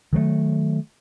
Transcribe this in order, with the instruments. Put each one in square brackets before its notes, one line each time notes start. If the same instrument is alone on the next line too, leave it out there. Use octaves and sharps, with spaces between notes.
[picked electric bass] D#3 F#3 G3 A3